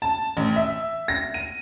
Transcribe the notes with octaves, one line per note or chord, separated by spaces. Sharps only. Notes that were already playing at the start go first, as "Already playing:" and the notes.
A5
A1
E5
A#6
D#7